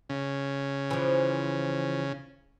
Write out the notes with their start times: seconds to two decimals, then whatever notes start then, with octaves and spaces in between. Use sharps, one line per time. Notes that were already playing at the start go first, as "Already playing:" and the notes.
0.10 C#3
0.91 E3 F3